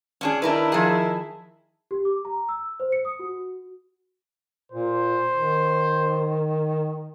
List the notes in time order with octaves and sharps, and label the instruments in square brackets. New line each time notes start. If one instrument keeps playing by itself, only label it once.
[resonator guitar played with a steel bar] C#4 D4 G#4
[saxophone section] D#3 E4 [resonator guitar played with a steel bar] D4 A#4 B4
[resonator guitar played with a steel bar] F3 G#4
[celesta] G4
D6
A#5
E6
C5
C#7
D#6
F#4
[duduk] A#2 [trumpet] C5
[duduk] D#3